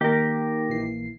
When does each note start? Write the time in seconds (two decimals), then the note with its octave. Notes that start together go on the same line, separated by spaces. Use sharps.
0.01 D#3 A#3 G4 A#4
0.69 A#1 E3 C7